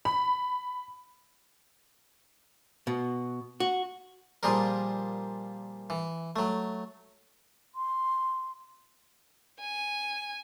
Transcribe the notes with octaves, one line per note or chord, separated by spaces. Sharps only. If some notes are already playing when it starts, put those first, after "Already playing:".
B5
B2
F#4
A#2 F3 G3 G#4 A#4
E3
F#3 A3
C6
G#5